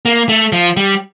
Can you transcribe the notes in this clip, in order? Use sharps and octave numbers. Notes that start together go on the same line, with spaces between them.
A#3
A3
F3
G3